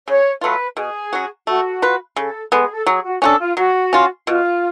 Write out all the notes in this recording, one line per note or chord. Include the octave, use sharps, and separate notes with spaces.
C#3 C#5
F#3 A3 F4 B4
B2 G#4
F#3 C#4 F#4
A3 F#4
F4 B4
C#3 A4
G#3 B3 A4
G#4
A4
F#3 G#4
F#4
C#4 D4 F#4 A4
F4
F#3 F#4
C#4 F4
B2 F4